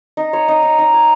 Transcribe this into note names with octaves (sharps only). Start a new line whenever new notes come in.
D#4
C#5
D#4
D#4
D#4
C#5